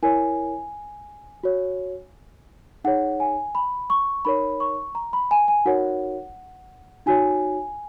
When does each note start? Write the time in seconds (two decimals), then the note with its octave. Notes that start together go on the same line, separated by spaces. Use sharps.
0.03 E4 A#4 C#5 G#5
1.43 F#4 C#5
2.84 D#4 G#4 C#5 F#5
3.20 G#5
3.55 B5
3.90 C#6
4.25 D#4 A#4 C#5 B5
4.60 C#6
4.95 A#5
5.13 B5
5.31 G#5
5.48 G#5
5.66 D#4 F#4 A#4 C#5 F#5
7.06 D#4 F#4 C#5 G#5